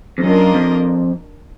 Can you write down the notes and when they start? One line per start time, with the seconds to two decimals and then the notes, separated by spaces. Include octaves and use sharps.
0.18 F2
0.23 F#2 A#3 D4 F4 A#4 D#5
0.54 F2